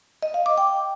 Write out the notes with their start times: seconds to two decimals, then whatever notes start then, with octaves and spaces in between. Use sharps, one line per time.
0.22 D#5
0.34 F5
0.46 D6
0.58 G5